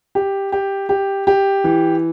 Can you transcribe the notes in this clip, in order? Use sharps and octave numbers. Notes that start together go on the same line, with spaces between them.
G4
G4
G4
G4
E3